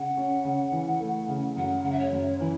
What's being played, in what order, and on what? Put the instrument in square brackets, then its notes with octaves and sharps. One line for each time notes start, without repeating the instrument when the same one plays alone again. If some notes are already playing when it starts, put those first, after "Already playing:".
Already playing: [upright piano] C#3 [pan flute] F#5
[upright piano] C#4
C#3
E3
A3
C#3
[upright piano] F#2 [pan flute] F#5
[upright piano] C#3 [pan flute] F#5
[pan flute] E5
C#5
[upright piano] F#2
[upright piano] E3 [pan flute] E4